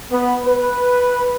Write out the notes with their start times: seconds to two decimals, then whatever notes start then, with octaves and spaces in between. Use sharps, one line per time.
0.11 B3
0.46 B4